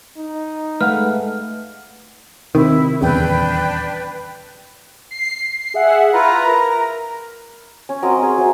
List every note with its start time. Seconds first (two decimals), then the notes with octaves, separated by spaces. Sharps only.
0.17 D#4
0.81 G#3 A3 B4 F5 F#5 F6
2.55 C3 D#3 E4
3.01 D#1 E2 C#3 D4 B4 G5
5.11 C7
5.74 G#4 E5 F#5
6.14 E4 F4 B4 A#5
6.47 A#4
7.89 C#4
8.02 F#3 C4 A#4 D#5
8.19 C#4 G#4
8.38 F#3 C5 E5